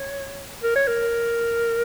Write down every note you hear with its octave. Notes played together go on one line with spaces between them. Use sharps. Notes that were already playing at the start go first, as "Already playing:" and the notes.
Already playing: C#5
A#4
C#5
A#4